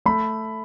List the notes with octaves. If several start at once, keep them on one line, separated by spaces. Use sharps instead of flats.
A3 B5